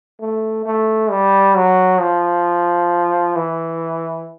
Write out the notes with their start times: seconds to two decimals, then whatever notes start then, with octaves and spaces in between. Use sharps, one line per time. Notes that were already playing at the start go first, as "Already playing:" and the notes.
0.20 A3
0.66 A3
1.10 G3
1.55 F#3
2.01 F3
3.36 E3